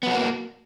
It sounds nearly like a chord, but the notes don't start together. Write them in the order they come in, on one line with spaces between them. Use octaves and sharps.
B3 F#3 F#4 A#3